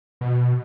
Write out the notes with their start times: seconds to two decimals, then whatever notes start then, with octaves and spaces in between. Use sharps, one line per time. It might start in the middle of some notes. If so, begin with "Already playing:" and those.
0.21 B2